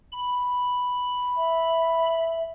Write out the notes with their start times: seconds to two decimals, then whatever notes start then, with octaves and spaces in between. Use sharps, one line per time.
0.12 B5
1.37 E5